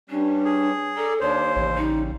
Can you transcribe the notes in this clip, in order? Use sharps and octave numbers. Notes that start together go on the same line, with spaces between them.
G2 G3 C#4 D4
G#4
A4 D5 A#5
D#2 D4 C5 C#5
A1 C#3 G3
D#4